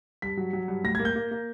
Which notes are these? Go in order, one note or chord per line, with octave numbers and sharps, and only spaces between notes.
G2 B6
F#3
F#3
G2
A2 A#6
A#3 G#6
G6
A#3
A#3